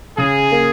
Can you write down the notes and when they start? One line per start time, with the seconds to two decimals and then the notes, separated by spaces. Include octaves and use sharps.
0.18 C#3 G#4
0.51 A#3